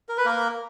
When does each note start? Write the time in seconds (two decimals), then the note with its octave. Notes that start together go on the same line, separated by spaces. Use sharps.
0.09 A#4
0.17 B4
0.25 A#3 A#4